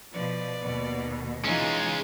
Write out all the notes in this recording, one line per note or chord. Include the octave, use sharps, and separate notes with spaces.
B2 F3 B4 D5
D#2 B2
E3 G#3 C#4 D#4 F4